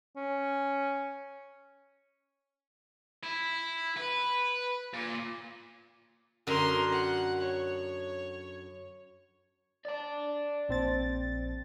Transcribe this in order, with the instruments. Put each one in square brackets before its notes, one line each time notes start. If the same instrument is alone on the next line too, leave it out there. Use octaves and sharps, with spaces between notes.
[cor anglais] C#4
[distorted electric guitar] E4
B4
A#2
[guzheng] F#2 D3 [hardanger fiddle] A#4 C6
[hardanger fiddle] F#5
C#5
[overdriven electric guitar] D5 A5
[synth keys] A#1 C4 A6